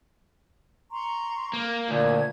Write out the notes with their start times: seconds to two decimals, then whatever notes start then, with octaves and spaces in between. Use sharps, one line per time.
0.91 A#5 C6 C#6
1.53 A#3
1.89 D2 A#2 G#6